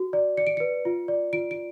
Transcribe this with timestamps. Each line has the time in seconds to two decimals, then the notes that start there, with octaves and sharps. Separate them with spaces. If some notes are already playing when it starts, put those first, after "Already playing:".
Already playing: F#4
0.13 D5
0.37 D5 C#7
0.47 D7
0.57 B4 C#7
0.85 F4
1.08 D5
1.33 F4 D7
1.51 D7